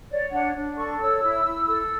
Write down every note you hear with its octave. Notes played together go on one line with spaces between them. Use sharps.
C#5 D5
D4 F#5
D4
A4 C#6
C#5 E6
E4
E4
A4